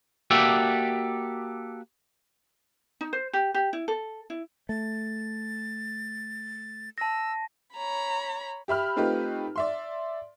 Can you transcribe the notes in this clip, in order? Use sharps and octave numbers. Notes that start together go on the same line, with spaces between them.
A#3 F#4 G4 A4 D5 E5
D#4
C5
G4
G4
E4
A4
E4
A3 A6
A5 E6 A#6
C#5 A#5 B5
G4 E5 B5 F6
A3 C4 D#4 F4 G4 B4
D5 E5 C6